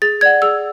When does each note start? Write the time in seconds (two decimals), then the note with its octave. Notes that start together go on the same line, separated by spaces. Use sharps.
0.02 G#4 A6
0.21 D5 F#5 G#6
0.42 G#4 E6